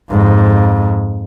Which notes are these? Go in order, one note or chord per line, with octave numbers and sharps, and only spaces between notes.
F2 G#2